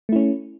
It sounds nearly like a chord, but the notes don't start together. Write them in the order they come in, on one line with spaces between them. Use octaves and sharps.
A3 E4 C#4